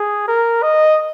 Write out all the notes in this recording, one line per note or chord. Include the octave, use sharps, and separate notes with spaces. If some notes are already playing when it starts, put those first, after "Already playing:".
Already playing: G#4
A#4
D#5